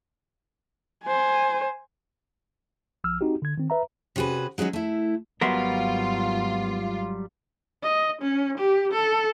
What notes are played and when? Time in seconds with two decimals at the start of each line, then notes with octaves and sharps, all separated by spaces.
1.03 C5 G#5
3.04 A#1 F3 E6 F6
3.21 C4 D#4 F#4 G4
3.42 D3 G#6
3.58 D#3 C4
3.70 B4 E5 A#5
4.16 C3 C#4 F#4 G#4 B4
4.58 F#3 G#3 C#4 D#4 F#4
4.73 A3 E4
5.41 G#1 F#3 G3 B3 F4 A#4 E5 C6
7.83 D#5
8.21 C#4
8.58 G4
8.92 A4